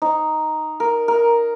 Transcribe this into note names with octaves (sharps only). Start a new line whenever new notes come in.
D#4
A#4
A#4